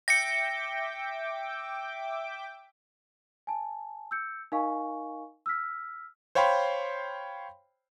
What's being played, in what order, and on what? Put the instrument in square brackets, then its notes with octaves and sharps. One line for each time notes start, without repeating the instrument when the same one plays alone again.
[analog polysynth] E5 G5 D6 [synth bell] A#6 C#7
[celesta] G#5 A5
E6 G6 C#7
D#4 A#4 D#5 F5 G#5 C#6
E6 F6 B6
[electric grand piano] C5 C#5 F5 G5 B5 C6